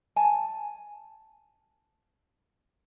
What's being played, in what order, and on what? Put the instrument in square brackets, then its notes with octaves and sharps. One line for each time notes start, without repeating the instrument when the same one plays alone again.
[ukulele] G#5 A5